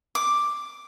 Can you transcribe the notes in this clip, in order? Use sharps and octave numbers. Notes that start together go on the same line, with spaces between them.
D6